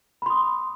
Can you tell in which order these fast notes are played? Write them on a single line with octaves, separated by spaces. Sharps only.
B5 C6 D#6